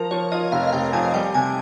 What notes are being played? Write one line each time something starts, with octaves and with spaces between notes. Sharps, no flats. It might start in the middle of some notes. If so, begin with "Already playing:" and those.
Already playing: F3 A#4
F3 C#5
F4 D#5
F1 F5
F5
F1 G5
F2 G#5
G3 G5
C3 G#5